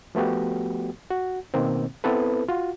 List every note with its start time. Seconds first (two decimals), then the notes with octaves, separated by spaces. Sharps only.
0.15 F3 A3 B3 F#4 G4
1.10 F#4
1.54 B2 D#3 A#3 C4
2.04 B3 C4 E4 A4 B4
2.48 F4 F#4